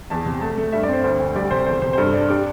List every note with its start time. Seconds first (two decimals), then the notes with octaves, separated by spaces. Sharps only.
0.10 E2 A5
0.26 C3
0.41 A3 A5
0.58 A3
0.72 G2 E5
0.83 D5
0.88 C4 C5
1.04 D2 C5
1.20 D2
1.35 G3 D5
1.51 C3 C5
1.66 E2 C5
1.82 C3 C5
1.93 C5
1.98 G2 A4
2.14 D4
2.29 D4 G4